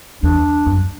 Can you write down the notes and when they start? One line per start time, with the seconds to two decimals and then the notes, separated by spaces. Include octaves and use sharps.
0.23 E2 D4
0.66 F#2